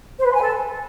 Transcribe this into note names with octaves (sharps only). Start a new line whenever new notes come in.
C5
B4
C6
G#5
A4